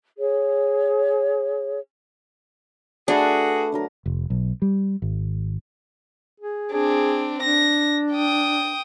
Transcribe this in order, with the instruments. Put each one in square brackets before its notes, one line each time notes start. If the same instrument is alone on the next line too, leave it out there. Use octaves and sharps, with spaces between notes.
[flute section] G#4 C#5
[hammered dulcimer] A3 B4 [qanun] D4 [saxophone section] F#4 G#4
[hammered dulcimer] D3 F#3 A#4
[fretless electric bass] F1
B1
G3
G#1
[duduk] G#4
[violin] C4 D4 [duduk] G#4
[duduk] D4 [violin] A#6
[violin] G5 D#6